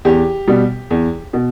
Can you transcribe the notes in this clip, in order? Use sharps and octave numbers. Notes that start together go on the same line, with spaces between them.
E2 G4
B2 G3
E2
B2